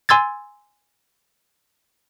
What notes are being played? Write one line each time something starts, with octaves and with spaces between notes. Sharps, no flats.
G#5 C6 E6 G#6 A6